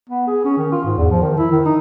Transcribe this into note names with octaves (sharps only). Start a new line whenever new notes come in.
B3
G#4
C#4
D#3
F4
G#2
E2
F3
D#3
E4
D#3
D#4